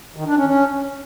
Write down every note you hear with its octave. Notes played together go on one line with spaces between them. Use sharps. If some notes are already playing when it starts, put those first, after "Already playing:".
D#3
D4
C#4
C#4